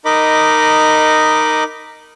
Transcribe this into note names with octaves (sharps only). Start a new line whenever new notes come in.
D#4 A#4 D#5 B5 D6